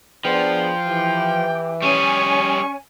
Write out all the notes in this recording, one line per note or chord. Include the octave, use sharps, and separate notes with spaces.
F3 B3 D4 G#4 G5
E3 G4
G3 C#4 G#4 G#5 C#6